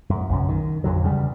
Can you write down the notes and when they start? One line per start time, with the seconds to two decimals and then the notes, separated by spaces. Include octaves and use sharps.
0.10 F#2
0.29 B1 F#2 C#3
0.49 D#3
0.84 A1 F2 D3 F#3
1.04 E2 C#3 G3